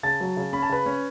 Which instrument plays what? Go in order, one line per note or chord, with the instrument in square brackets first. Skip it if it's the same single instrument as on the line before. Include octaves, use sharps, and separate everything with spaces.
[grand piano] C#3 A5 A6
F#3
C#3
C#4 B5
A5
C#3 B4 B5
C#4